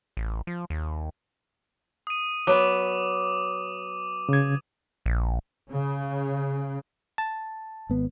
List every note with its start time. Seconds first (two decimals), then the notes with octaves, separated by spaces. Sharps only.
0.17 A1
0.47 F3
0.70 D#2
2.07 D#6 D#7
2.47 F#3 B3 D6
4.29 C#3 G#6
5.06 A#1
5.71 C#3
7.18 A5
7.90 G#1 B3